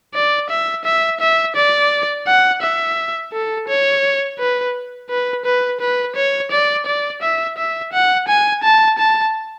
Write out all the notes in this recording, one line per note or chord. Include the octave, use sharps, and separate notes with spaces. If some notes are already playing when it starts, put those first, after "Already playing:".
D5
E5
E5
E5
D5
F#5
E5
A4
C#5
B4
B4
B4
B4
C#5
D5
D5
E5
E5
F#5
G#5
A5
A5